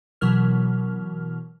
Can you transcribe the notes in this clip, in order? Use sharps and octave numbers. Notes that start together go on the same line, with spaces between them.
B2 E3 F#3 A#4 F6